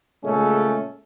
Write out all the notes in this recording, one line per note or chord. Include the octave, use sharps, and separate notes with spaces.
A#2 C#3 G#3 A3 C#4 A4